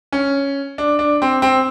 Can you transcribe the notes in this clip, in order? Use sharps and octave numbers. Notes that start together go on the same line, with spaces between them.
C#4
D4
D4
C4
C4